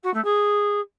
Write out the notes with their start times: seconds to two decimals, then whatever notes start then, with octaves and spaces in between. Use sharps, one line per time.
0.03 F#4
0.14 A3
0.24 G#4